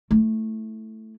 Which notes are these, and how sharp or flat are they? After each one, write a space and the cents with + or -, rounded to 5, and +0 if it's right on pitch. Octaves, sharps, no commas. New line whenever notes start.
A3 +0 E4 -5